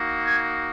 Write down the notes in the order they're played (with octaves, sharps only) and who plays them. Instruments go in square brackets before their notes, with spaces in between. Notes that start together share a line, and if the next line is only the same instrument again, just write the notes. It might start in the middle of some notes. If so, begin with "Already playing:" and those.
Already playing: [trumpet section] A#3 D#4 F#4
G#5